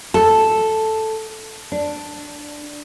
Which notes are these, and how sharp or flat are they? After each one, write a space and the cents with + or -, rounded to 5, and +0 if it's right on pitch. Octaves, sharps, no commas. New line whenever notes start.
A4 +0
D4 +0